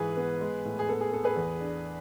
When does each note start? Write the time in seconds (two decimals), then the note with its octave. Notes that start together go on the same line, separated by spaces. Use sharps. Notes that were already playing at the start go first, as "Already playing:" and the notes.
Already playing: G#2 E3 G#4 B4
0.17 B3
0.41 G#3
0.65 A2
0.79 G#4
0.88 B3 A4
1.01 G#4
1.13 B3 A4
1.24 G#4 B4
1.36 E2
1.60 D4